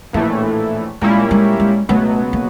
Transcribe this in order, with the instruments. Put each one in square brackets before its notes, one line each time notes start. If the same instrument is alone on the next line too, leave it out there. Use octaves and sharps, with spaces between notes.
[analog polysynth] A#1 A2 E3 A3 [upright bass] A#3
[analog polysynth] A#2 G3 A#3 C#4 E4 [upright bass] G#3
[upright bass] G#3
G#3
[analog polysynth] C#2 B2 F#3 B3 [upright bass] A3
[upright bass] A#3